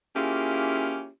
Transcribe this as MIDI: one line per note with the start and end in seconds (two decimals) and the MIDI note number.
0.15 1.08 58
0.15 1.08 61
0.15 1.08 64
0.15 1.08 65
0.15 1.08 67
0.15 1.08 68